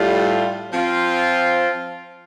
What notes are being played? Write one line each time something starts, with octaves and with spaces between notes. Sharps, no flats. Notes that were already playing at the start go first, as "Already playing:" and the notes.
Already playing: A2 G3 F4
F3 C4 F4